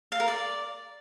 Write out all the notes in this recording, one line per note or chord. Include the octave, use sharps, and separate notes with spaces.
F5
A#4
D5